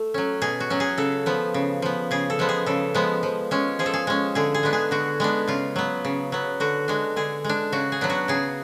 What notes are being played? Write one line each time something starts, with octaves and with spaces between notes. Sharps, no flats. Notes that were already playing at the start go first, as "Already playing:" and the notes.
Already playing: A3
F#3 C#4
B2 G#4
F#4
F#3 C#4
G#4
C#3 A4
F3 B3
C#3
F3 B3
C#3 G#4
A4
F3 G#3 B3
G#4
C#3 A4
F3 G#3 B3
F3
G#3 C#4
F3 G#4
A4
G#4
G#3 C#4
D3 G#4
G#4
G#3 B3 D4
G#4
D3 F#4
G#3 B3 D4
C#3 F4
F#3 B3
C#3
F#3 B3
D3 F#4
G#3 D4
D3 G#4
G#3 D4
C#3 F#4
G#4
F#3 B3 D4
F#4
C#3 G#4